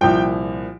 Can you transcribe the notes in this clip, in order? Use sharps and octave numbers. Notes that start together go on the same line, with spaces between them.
C2 A#2 F3 G5